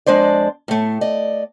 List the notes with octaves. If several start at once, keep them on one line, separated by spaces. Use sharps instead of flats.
F2 G#3 D4 C5 D5
A2 A3
D5 D#5